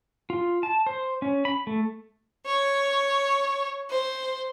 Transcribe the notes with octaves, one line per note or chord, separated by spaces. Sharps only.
F4
A5
C5
C#4
B5
A3
C#5
C5